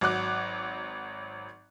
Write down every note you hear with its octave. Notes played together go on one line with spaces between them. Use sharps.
G#1 F#3 F#5 D6 F#6